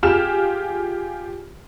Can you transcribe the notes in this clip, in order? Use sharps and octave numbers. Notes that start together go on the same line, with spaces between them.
F4 G4 G#4 F6 E7